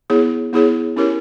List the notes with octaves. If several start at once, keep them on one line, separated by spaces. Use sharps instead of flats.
B3 E4 G#4 C#5
B3 E4 G#4 C#5
C#4 E4 G4 A#4 C#5